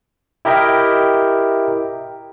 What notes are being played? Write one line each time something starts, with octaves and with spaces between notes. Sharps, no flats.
E4 G4 A#4 D#5 E5 G5